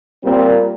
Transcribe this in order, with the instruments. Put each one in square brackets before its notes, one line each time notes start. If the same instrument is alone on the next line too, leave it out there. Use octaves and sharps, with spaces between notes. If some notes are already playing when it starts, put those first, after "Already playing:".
[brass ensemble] A#2 G3 A#3 C4